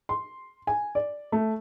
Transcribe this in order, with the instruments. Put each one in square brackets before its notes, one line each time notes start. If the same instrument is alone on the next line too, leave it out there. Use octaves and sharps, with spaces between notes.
[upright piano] C6
G#5
D5
A3